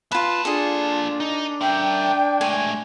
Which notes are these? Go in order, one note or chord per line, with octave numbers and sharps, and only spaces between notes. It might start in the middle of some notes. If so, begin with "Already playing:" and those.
A#3 F4 B4 A5
D4 F4 G#4 A4
D#4
A#4 E5 G5
G#3 A3 G#5